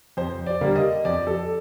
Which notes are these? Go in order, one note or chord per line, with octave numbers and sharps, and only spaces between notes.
F2 C5
D5
D3 G3 A#3
D#5
F2 D5
A4